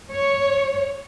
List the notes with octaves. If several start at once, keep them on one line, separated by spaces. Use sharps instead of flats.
C#5